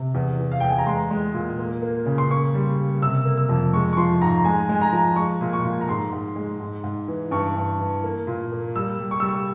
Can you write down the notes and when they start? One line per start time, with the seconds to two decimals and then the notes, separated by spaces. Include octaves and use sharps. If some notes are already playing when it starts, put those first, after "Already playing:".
Already playing: C3
0.15 E2
0.40 E3
0.52 F5
0.60 E2 G5
0.70 G#5
0.79 A#5
0.86 G#3 C6
1.11 G#3
1.34 A#2
1.59 A#3
1.82 A#3
2.06 C#3
2.18 C6
2.31 A#3 C#6
2.54 G3
2.79 A#3
3.02 C3 E6
3.25 A#3
3.37 E6
3.49 F2
3.73 G#3 C#6
3.93 C#6
3.97 F3 C6
4.22 G#2 A#5
4.45 G#3 G#5
4.69 G#3
4.75 G#5
4.82 A#5
4.93 F3
5.16 G#3 C#6
5.41 A#2
5.53 C#6
5.65 A#2
5.81 A#5
5.89 G#2 C6
6.13 G#2
6.36 G#3
6.60 G#2
6.84 G#2
7.08 E3
7.31 G2 C#6
7.56 G2
7.80 E3
8.04 A#3
8.27 A#2
8.52 A#3
8.76 G3 E6
8.99 G3
9.11 C#6
9.20 G3 E6
9.28 C#6